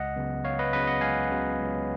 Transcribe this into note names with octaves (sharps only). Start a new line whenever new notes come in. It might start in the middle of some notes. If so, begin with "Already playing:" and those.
Already playing: C#2 D#5 F#5
C#3 F#3 B3
C#2 C#5 F5
B4 D#5
C#3 F#3 B3 B4 D#5
D#5 F#5
C#2 F5 G#5
C#3 F#3 B3
C#2